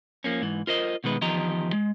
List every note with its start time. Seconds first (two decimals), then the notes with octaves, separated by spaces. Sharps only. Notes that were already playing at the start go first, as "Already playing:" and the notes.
0.24 F3 A#3 C#4
0.42 G#2 E3
0.67 F4 A#4 C5 D#5
1.04 B2 D#3 G#3 B4
1.21 E2 D#3 F3 G4 D#5 A#5
1.73 G#3